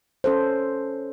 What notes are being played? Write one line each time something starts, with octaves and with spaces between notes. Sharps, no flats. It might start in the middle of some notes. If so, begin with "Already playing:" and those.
C#4 A4 C5